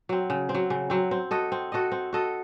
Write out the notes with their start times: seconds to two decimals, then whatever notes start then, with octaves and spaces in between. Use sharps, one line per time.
0.09 F#3 C4
0.30 C#3
0.49 C4
0.55 F#3
0.70 C#3
0.90 F#3 C4
1.11 C4
1.31 F#4 A4 D#5
1.52 C4
1.72 F#4 A4 D#5
1.92 C4
2.13 F#4 A4 D#5